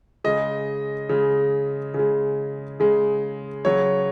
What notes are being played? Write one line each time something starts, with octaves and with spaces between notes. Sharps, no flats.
C#3 G#3 D#5
C#3 G#3
C#3 G#3
C#3 G#3
C#3 F#3 C#5